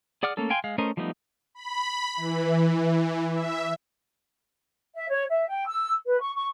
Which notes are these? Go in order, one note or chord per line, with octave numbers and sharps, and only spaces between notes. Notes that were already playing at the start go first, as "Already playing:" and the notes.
G#4 D5 F#5 D6 F6
A3 A#3 C#4 A4
F5 G5 G#5 C6
G#3 F5
A3 C#4 A#4 C5 D#5
F3 G3 A3 B3 D#4
B5
E3
E5
E5
C#5
E5
G5
E6
B4
C#6
C#6